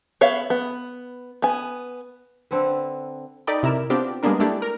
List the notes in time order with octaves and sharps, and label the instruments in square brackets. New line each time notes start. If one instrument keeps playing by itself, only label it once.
[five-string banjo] B3 C#5 E5 F5
B3
B3 G#5
[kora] D3 C4 A4 B4
[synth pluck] D#4 A4 D5 D#5 G5 B5
C3 E4 A#4 E7
B3 C4 D4 F4 G4
G3 G#3 A#3 B3 D4 A#4
A3 D4 E4 G4 A4
A#4